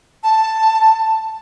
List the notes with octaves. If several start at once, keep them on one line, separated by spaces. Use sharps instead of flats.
A5